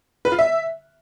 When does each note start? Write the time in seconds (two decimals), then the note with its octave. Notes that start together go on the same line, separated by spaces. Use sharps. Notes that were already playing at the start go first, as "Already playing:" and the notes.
0.25 B4
0.32 F4
0.39 E5